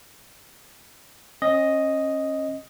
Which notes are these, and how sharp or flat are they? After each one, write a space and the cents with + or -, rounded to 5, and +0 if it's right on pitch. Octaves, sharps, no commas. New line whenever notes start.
C#4 -35 D#5 +0